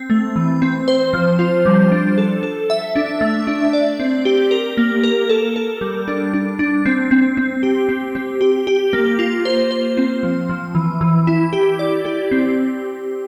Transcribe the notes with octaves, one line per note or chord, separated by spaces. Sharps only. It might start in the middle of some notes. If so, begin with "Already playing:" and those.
Already playing: C4
A3
E3
C4
C5
F3
F4
G3
D4
A4
A4
E5
D4
A3
D4
D5
C4
G4
A#4
A#3
A#4
A4
A4
G3
D4
D4
D4
C4
C4
C4
G4
C4
C4
G4
G4
A#3
F4
C5
C5
C4
F3
F3
E3
E3
E4
G4
D5
G4
C4